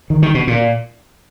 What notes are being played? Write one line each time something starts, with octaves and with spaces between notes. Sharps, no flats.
D#3
D#3
B2
A#2